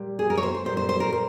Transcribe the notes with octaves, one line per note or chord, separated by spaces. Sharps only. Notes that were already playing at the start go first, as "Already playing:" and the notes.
Already playing: A#2 G3
G#4
A#4
C#5
C5
C5
A#2 G3 C5
C5
C5
A#4
C5